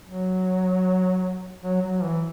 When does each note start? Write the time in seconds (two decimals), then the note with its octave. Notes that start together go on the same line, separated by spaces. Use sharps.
0.05 F#3
1.63 F#3
1.82 F#3
2.03 E3